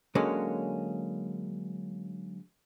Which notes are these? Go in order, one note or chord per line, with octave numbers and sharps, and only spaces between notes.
D3 F#3 G#3 A#3 C#4